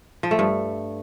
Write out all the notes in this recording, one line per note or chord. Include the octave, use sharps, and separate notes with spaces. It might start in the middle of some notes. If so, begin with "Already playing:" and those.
F3
A3
G2